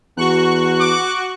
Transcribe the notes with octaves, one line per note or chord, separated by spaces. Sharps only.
E2 F#4 C#6 F#6
D6